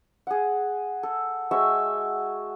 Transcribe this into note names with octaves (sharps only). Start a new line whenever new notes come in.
G#4 F#5
A4
G#3 F#4 C#5 E5